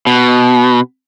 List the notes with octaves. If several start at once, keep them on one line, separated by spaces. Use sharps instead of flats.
B2